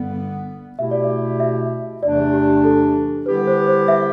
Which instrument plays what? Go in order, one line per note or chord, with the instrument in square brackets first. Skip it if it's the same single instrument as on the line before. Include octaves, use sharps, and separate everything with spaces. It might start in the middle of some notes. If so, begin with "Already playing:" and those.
Already playing: [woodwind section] G2 D3 G3 B3
[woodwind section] B2 A3 E4 G4 [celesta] E5
[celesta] D5
E5
E5
[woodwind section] E2 C3 E3 A3 D4 [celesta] D5
[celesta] G4
G4
G4
A4
[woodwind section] D3 G3 B3 E4 G4 [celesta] B4
[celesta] C5
C5
E5